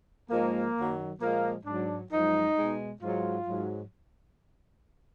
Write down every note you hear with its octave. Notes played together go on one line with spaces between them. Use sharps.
G#2 F3 G#3 A#3
F#2 D#3 F#3
A#2 F3 G#3 A#3
G#2 F#3 D4
F#2 F3 G#3 D#4
B2 G#3
G#2 F#3 F4
G#2 F#3